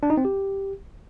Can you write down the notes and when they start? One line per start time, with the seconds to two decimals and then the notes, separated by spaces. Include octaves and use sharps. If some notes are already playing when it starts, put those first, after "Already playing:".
0.03 D4
0.10 D#4
0.17 C4
0.25 G4